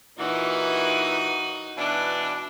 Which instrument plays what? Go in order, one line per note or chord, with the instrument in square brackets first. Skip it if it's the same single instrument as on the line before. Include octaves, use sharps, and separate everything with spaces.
[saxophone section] A#2 E3 [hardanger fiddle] D#4 F#4
[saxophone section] B2 E3 D4